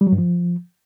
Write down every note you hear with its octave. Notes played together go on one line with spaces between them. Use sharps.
G3
F#3
G2
F3